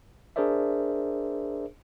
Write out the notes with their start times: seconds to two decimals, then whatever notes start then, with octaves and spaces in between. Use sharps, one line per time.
0.36 D4 G#4 A#4 C5 D5 E5